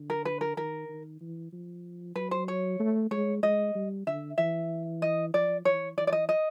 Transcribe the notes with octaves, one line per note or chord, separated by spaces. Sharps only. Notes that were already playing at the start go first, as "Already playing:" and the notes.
Already playing: D3
A#4
B4
A#4
D#3 A#4
D#3
E3
F3
F#3 B4
C5
C#5
A3
G#3 C#5
G#3 D#5
G3
D3 E5
E3 E5
D#5
F3 D5
E3 C#5
E3 D5
D5
D#5
D#5